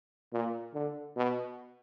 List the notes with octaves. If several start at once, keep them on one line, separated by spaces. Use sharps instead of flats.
A#2
D3
B2